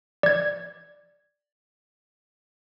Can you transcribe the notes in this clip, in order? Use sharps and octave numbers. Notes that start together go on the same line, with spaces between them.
D5 G#6